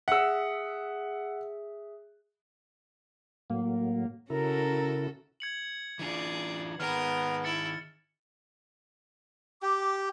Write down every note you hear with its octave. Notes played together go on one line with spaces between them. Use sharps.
G#4 E5 F#5 E6
A2 F#3 A#3
C#3 C#4 E4 F#4 A4 A#4 A#5
G#6 C#7 F#7
E3 D4 F4 G#4 D5
D#3 B3 G#4 A#4 D#6 F6
E4 A6 C#7
G4 D6